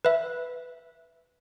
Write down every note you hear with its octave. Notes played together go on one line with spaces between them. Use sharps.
B4 E5